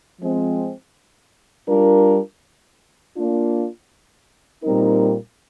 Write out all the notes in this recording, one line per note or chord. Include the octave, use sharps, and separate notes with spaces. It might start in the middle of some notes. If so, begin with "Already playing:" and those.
F3 G#3 C4
G3 D4 F4 A#4
A#3 D4 F4
A#2 G3 C4 D#4 A#4